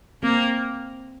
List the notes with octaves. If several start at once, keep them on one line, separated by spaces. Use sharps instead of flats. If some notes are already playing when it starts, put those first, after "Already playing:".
A#3 C4